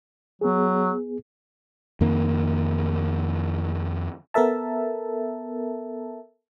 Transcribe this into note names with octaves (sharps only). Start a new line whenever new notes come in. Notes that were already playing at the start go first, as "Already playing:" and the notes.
F#3 B3 G#4
F2 D#3 A#3
B3 A4 A#4 E5 A5